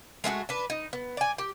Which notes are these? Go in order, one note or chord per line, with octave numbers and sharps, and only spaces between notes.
G#3 A3 D#4 F#4
D4 B4
D#4
B3
D5 G#5
G4